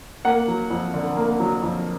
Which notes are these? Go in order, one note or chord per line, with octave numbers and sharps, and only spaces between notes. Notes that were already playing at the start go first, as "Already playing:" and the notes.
A#3 F#5
F#3
F2
D3
A#3
F#3
F2